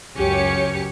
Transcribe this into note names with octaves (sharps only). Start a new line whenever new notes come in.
C#2 F#2 C#4 G4 C#5 C#7